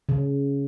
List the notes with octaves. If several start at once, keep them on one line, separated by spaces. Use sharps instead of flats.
C#3